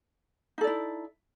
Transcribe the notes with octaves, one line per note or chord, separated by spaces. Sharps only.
D#4 E4 A4 D5